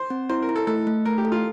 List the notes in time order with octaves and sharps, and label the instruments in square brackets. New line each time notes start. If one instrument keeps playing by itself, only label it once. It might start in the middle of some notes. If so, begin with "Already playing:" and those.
Already playing: [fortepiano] C5
[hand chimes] C4
[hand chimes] E4 [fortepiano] C5
[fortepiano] A#4
[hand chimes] E4
[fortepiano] A4
[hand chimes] A3 [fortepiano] A4
[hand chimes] A3
[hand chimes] A3 [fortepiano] A#4
[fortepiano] G4
[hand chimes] A4
[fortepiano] F4